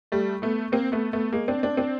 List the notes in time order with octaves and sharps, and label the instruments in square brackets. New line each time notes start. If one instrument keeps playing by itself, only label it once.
[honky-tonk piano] G3 A3
A3 B3
A#3 C4
A3 B3
A3 B3
G#3 A#3
C4 D4
C4 D4
C4 D4